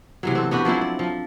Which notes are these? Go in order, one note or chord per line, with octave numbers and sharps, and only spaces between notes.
C3 E3 F#3
C4 A4
B3 D4 F#4 G4
F3 F#3 C4 E4
D5
F3